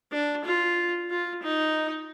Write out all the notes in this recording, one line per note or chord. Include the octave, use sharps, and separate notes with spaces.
D4
F4
F4
D#4